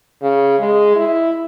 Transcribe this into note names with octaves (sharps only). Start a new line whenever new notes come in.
C#3
G#3
E4